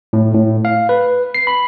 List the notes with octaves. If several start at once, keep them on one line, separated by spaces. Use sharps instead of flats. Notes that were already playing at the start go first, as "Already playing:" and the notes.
A2
A2
F5
B4
C7
B5